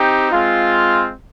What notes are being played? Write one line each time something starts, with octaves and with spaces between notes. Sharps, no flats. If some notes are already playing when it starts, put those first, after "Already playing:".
Already playing: C4 D#4 G4
G#3 C4 F4